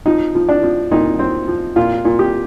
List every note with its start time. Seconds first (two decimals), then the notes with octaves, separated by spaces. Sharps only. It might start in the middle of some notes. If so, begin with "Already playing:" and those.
0.06 F3 D#4
0.35 F3
0.49 D4
0.63 F3
0.91 A#2 D#4
1.19 C4
1.48 F3
1.76 A#2 F4
2.05 A#2
2.19 G4